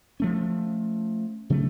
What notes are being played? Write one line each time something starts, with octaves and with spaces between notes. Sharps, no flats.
F3 A3 C#4
C#3 F#3 A3